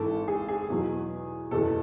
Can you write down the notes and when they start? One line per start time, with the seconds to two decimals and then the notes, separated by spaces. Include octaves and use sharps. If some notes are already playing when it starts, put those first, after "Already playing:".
Already playing: G#1 G#2 E3 A4
0.28 G#4
0.48 G#4
0.69 E2 B2 F#3
1.51 F#1 E2 B2 A4